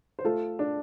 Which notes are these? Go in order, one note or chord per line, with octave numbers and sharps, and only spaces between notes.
C5
A3 F4 A4
D4